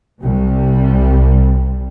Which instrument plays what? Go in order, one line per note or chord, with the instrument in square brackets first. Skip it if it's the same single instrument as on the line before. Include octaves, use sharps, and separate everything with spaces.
[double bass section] C2 C3 G3